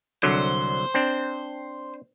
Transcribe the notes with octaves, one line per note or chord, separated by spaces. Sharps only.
C2 D3 F#3 C5
C4 D4